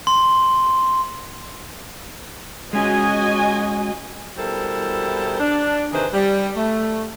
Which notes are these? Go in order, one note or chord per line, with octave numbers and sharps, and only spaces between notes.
C6
G#3 C#4 F#4 D#5 G#5
B2 G3 E4 A4 A#4 C5
D4
C3 D#3 E3 G#4 B4 C5
G3
A3